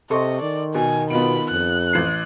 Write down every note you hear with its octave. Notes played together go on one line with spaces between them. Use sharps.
C3 A4 D#5 C6 C#6
D#3 D5
B2 G#5
B2 B3 F4 B5 D7
F2 F#6
A1 C7